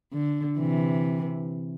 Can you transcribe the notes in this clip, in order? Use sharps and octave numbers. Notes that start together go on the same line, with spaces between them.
D3
C3 E3